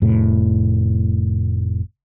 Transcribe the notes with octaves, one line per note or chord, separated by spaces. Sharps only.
F1 A2